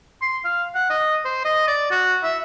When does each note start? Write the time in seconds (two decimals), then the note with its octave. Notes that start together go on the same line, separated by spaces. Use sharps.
0.22 C6
0.45 F5
0.75 F#5
0.90 D#5
1.25 C5
1.45 D#5
1.68 D5
1.91 F#4
2.23 E5